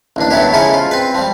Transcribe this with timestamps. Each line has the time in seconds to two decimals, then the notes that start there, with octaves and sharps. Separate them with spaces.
0.16 A1 D#2 D4
0.30 F#3 A3 B3 E4 G4
0.53 C#3 F3 C#4 D#4 E4 A4
0.74 F4
0.91 C4 B4
1.15 F3 G3